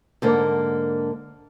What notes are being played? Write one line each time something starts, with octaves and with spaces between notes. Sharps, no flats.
G#2 D3 A#3